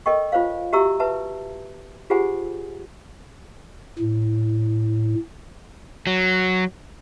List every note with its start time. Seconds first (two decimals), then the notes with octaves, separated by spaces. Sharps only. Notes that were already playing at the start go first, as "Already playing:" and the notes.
0.06 A4 A#4 D#5 G5 C#6
0.32 F4 C5 C#5 F5
0.72 F#4 G4 E5 A#5 C#6 E6
1.00 B4 E5 A5
2.10 F4 G4 G#4 C5 F#5 G#5
3.98 A2
6.07 F#3